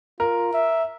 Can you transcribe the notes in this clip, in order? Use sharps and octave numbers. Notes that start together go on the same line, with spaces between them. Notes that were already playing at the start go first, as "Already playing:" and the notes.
F4 A#4
E5